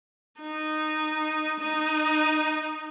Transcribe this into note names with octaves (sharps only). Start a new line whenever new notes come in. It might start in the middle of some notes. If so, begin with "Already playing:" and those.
D#4
D#4